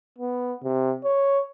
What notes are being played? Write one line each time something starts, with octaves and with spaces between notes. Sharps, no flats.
B3
C3
C#5